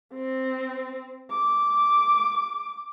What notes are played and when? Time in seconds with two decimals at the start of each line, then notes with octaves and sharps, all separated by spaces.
0.15 C4
1.31 D6